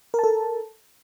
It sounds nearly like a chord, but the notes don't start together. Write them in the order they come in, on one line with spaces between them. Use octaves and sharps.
A#4 A5 A4